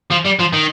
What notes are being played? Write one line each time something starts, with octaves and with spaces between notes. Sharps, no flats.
F3
G3
F3
D#3